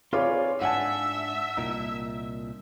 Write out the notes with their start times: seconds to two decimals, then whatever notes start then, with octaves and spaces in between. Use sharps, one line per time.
0.13 C4 F4 G#4 B4 C#5 D5
0.62 G#2 D4 E5 F#5 G#5 A5
1.57 C2 A#2 D#4